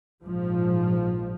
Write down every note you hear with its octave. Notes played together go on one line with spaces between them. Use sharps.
A#1 G#2 F3